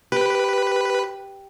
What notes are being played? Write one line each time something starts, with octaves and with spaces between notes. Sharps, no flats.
G4 B4